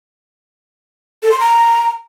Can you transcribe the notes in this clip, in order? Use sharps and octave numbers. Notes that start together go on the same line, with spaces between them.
A4
C6
A#5